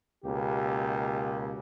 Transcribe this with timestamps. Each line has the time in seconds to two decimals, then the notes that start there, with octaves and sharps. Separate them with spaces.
0.23 C#2 B2 A#3 G4